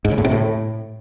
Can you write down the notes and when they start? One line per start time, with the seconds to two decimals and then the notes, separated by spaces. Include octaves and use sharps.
0.05 G#2
0.11 C#3
0.18 A2
0.25 C3
0.31 A2